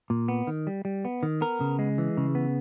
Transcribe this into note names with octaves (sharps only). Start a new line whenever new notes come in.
A#2
B3
D#3
G3
G3
B3
D#3
B3 A#4
C#3
G#3
E3
C#3
B3